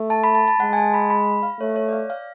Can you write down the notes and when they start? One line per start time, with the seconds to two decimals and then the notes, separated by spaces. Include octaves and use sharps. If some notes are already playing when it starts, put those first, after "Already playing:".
Already playing: A3
0.10 A5
0.24 B5
0.35 A5
0.48 A5
0.60 G#3 F#5
0.73 G#5
0.77 A5
0.94 B5
1.10 B5
1.43 F5
1.60 A3 C#5
1.76 C#5
1.88 D5
1.93 F5
2.10 F5